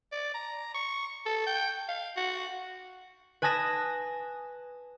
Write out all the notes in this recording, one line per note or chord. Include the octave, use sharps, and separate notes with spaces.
D5
A#5
C#6
A4
G5
F5
F#4
B4 G#5 A5 D#6 A#6 E7